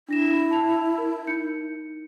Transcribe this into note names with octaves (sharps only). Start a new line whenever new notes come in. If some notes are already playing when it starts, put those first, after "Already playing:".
D4 E4 A#6 E7
A5 F7
A#4
D#4 G6 C#7